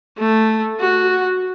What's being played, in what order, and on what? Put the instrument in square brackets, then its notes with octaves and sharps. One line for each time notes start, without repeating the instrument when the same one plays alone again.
[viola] A3
F#4